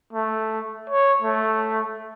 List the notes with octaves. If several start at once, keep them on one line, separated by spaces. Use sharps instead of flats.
A3
C#5
A3